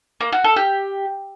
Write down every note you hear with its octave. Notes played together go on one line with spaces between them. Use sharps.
A#3
F#4
A4
G4